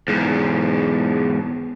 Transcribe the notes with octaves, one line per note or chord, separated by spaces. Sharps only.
E2 G#2